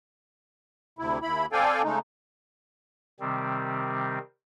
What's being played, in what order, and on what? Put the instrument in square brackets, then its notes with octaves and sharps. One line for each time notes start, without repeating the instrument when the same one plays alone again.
[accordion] D2 C3 E4
D#2 E4 B5
C4 A4 D5 F5 G5 G#5
C#3 G#3 A3 D#4
[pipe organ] C3 D#3 G3 C4